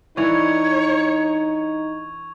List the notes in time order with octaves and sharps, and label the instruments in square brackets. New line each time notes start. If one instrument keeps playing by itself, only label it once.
[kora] E3 D4 [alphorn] D#4 [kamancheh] C#5 [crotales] C#6 G#6 F7